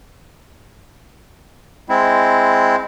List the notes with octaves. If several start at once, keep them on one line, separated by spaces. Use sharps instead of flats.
G#3 C4 E4